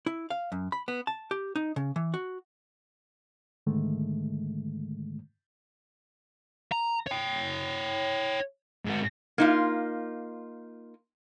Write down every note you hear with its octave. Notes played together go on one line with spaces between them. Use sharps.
E4
F5
F#2
B5
B3
A5
G4
D#4
C#3
E3
F#4
G#2 D3 D#3 G#3 A3
A#5
C#5 G5
G#2 F#4
A#3 D#4 F4